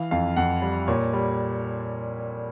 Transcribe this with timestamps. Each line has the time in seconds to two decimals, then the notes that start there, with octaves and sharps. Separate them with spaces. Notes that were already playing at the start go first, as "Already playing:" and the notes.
Already playing: E3 F5
0.11 F2 F5
0.36 F2 F#5
0.62 G3
0.88 A#2 C#5
1.13 G3